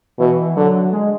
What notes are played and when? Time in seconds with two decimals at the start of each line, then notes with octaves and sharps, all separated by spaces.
0.19 B2 E3
0.56 D3 F#3
0.93 G#3